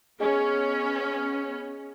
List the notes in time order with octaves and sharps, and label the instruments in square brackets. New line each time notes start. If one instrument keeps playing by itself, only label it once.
[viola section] B3 C#4 [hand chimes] G#4 D#5 G#5